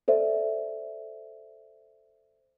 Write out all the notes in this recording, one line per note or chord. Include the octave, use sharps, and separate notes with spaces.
A4 C5 D5 E5